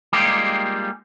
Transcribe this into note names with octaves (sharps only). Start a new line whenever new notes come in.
G3 G#3 A#3 D#4 F4 G4